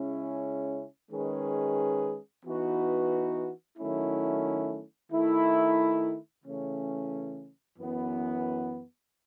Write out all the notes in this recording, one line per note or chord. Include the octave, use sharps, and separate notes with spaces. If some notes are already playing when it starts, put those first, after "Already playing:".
Already playing: C#3 G#3 C#4 E4
D#3 G#3 C#4 G#4 B4
E3 B3 D#4 F#4 B4
D#3 F#3 A3 C#4 E4
D#3 A3 E4
C#3 E3 A3 C#4
F#2 E3 B3